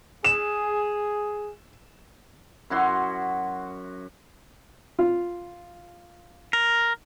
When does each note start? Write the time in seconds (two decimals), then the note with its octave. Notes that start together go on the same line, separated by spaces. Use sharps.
0.24 G#4 E7
2.70 F#2 E4 F#4 C6
4.99 F4
6.53 A#4